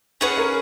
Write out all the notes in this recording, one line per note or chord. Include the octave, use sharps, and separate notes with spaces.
C#4 G#4 B4 C#5 F#5
A#4